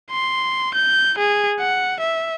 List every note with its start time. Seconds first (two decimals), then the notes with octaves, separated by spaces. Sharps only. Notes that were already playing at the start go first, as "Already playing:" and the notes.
0.11 C6
0.74 G6
1.18 G#4
1.59 F#5
2.00 E5